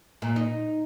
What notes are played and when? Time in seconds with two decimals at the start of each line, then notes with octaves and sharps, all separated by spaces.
0.22 A#2
0.36 D#4